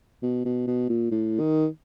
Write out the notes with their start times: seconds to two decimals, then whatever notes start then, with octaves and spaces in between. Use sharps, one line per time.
0.23 B2
0.45 B2
0.67 B2
0.89 A#2
1.11 A2
1.40 D#3